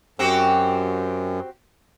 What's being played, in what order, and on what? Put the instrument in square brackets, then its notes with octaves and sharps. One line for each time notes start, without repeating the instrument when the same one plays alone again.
[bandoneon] F#2 [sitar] C4 F#4 G4